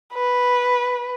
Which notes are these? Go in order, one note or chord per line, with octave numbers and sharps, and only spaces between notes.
B4